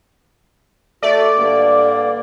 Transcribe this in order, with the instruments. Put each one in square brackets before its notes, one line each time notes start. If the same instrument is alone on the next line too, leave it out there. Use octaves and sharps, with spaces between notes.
[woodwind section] A3 F#4 [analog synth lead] D5
[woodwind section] G2 D3 A#3